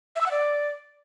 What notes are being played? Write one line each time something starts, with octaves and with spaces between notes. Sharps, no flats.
E5
E6
F#5
D5